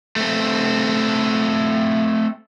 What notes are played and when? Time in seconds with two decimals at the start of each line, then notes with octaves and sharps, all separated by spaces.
0.16 A3 C4